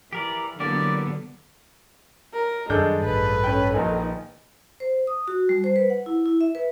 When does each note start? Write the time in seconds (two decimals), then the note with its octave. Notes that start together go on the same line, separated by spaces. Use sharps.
0.13 E3 G4 A#4 D5
0.60 D3 E3 F#3 A#3 B3 G4 D5
2.34 A#4
2.70 F#2 D#3 G3 G#3 D4 G#4 A4 G6
3.05 A1 G2 B4
3.44 C#4 G5
3.74 A#1 D#3 G#5
4.80 C5
5.07 D#6
5.28 F#4
5.49 G3
5.64 C5
5.76 B4
5.90 F#5
6.06 E4
6.26 E4
6.41 E5
6.55 B4